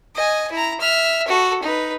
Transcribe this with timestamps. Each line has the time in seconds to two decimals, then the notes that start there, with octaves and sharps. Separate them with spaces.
0.15 D#5 G#5
0.52 E4 A#5
0.80 E5 F6
1.27 F#4 A4
1.62 D#4 B4